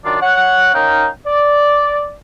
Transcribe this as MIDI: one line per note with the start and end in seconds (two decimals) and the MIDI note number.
0.04 0.19 42
0.04 0.19 51
0.04 0.19 62
0.04 0.19 65
0.04 0.19 74
0.21 0.72 73
0.21 0.72 78
0.74 1.07 61
0.74 1.07 63
0.74 1.07 70
0.74 1.07 77
0.74 1.07 79
1.25 2.14 74